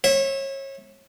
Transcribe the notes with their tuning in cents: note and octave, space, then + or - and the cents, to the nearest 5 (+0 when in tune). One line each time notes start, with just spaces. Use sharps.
C#5 -30 E5 -15